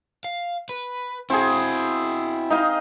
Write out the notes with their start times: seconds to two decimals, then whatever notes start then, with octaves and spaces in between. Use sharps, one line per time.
0.24 F5
0.69 B4
1.30 C4 E4 F#4 G#4
2.50 D#4 D#5 F5